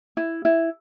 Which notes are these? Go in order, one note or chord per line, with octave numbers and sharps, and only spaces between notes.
E4
E4